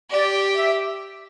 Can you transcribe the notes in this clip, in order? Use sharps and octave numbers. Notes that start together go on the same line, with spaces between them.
G4 D5
E5